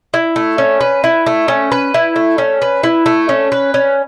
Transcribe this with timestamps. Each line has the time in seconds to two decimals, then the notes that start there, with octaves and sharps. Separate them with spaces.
0.14 E4
0.36 A3
0.58 C#4
0.81 B4
1.04 E4
1.26 A3
1.48 C#4
1.72 B4
1.94 E4
2.16 A3
2.38 C#4
2.62 B4
2.83 E4
3.06 A3
3.29 C#4
3.52 B4
3.74 C#4